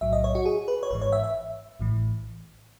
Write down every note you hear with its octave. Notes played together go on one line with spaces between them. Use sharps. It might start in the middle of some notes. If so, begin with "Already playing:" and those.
B1 A2 F#3 E5
D#5
C#5
F#4
G#4
B4
C#5
G#1 G#2 E3 B4
C#5
E5
E5
A1 A2 E3